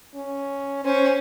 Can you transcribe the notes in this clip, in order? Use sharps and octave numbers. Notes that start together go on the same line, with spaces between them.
C#4
C#4 C5